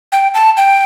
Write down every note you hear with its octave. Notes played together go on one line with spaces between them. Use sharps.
G5
A5
G5